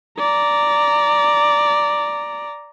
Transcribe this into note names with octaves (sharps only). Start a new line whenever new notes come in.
D5 A#5